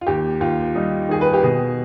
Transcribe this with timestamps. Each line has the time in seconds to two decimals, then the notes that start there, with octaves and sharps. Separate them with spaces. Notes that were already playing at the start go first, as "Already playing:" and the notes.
0.01 F4
0.07 D#2 G4
0.40 D#2 F4
0.75 G3 D#4
1.09 D#3 G#4
1.21 B4
1.33 G4
1.43 B2 G#4